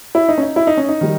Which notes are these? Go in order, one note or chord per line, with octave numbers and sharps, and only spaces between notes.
E4
D#4
C#4
D#4
E4
D#4
C#4
D#4
D#3 G3